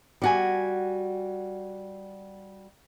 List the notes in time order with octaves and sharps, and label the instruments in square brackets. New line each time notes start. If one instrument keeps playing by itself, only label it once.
[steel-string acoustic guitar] G3 F#4 G#5